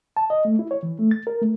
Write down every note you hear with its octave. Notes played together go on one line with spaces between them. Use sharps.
A5
D#5
A3
E4
C#5
E3
A3
A6
A#4
A3